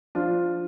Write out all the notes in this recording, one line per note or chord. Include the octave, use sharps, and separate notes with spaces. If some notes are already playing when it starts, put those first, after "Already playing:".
F3 D4 F4